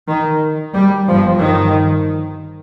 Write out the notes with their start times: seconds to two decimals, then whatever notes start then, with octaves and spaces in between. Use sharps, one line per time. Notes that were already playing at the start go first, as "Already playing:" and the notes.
0.09 D#3
0.74 G3
1.07 G1 G2 F3
1.40 D#3